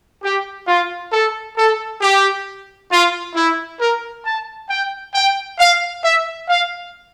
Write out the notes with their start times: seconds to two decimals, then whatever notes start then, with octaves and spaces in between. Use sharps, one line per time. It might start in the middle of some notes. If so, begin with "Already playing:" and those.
0.23 G4
0.67 F4
1.12 A4
1.57 A4
2.02 G4
2.91 F4
3.35 E4
3.80 A#4
4.25 A5
4.69 G5
5.14 G5
5.59 F5
6.03 E5
6.48 F5